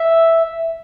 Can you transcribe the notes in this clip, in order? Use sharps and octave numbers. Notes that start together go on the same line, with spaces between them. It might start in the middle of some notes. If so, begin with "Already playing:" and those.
Already playing: E5